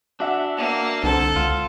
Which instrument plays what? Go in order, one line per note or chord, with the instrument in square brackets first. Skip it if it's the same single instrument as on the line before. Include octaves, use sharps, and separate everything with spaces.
[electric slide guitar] D4 [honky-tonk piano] F#4 E5 F#5
[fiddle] A#3
[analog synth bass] C2 [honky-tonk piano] D3 C4 [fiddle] A4
[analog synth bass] C#2 [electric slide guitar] F4